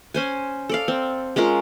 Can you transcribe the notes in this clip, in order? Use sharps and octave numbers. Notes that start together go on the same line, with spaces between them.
C#4 C5 G#5
A4 D5 F5
C4
G#3 C#4 F4 A#4